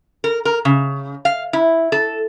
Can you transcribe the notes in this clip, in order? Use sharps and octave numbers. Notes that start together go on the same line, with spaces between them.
A#4
A#4
C#3
F5
E4
A4